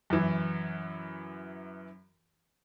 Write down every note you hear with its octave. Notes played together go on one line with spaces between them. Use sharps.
F#2 E3